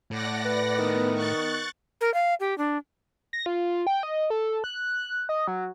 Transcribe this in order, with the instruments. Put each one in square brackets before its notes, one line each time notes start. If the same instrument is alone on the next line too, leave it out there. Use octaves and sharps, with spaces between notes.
[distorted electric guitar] A2 [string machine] D5 F#5 A#6
[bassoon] B4
[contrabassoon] D#3 [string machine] B3
[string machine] C#6 F#6 A6
[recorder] A#4
F5
G4
D4
[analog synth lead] A#6
F4
G5
D#5
A4
F#6
D#5
F#3